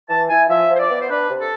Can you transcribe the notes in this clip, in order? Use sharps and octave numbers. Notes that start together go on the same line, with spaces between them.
E3 A5
E4 G#5
F3 E5
F3
C5
D5
B3
C5
D4 B4
C3
A4